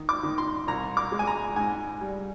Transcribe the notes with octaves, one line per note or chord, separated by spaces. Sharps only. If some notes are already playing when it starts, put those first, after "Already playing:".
Already playing: D#3
D6
D#3
C6
C2 A#5
D6
G#3
G#5
A#5
G#2 G#5
G3